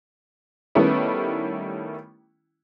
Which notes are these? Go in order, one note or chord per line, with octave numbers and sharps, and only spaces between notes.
D#3 G3 A3 B3 C#4 E4